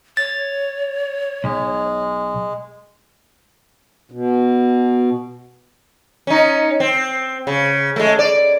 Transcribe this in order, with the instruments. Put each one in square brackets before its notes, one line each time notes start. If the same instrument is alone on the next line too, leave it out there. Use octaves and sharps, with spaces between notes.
[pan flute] C#5 [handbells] A6
[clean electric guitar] B1 [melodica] G#3
[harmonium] B2
[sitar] C#4 D#4
C4
C#3
G#3 A3
D5